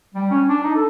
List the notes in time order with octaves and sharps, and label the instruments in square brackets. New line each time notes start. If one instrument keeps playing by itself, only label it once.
[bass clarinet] G3
C#4
D4
D#4
A4